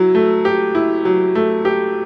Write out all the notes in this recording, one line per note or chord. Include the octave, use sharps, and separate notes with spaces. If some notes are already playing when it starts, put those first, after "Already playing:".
Already playing: F#3 E4
A3
G4
E4
F#3
A3
G4